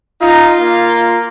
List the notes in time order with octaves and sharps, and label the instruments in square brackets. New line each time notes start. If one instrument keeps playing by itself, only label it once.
[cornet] D#4 [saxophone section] F4
[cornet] A#3